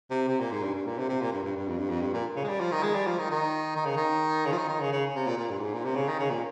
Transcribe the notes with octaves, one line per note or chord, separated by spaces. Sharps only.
C3
C3
A#2
G#2
G2
G2
A#2
C3
C3
A#2
G2
G2
G2
F2
G2
F2
G2
A#2
C#3
G#3
G3
F3
D#3
G#3
G3
F3
D#3
D#3
D#3
C#3
D#3
C#3
F3
D#3
D#3
C#3
C#3
C3
A#2
A#2
G2
G#2
A#2
C3
C#3
D#3
C#3
A#2